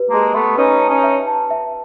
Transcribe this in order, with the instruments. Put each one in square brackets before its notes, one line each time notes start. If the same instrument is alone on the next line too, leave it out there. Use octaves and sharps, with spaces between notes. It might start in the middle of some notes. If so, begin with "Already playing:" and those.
Already playing: [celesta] G4 B4
[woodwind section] G#3 A#3 [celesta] A5
[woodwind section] A3 B3 [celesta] E5
[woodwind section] C#4 D#4 [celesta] B4
[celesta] A5
[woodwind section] C#4 D#4
[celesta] E5
A5
E5